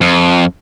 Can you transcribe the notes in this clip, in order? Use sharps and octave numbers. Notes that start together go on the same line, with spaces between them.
F2